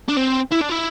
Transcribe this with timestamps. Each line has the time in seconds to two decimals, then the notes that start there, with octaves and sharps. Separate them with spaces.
0.09 D4
0.17 C4
0.52 E4
0.61 D4
0.70 E4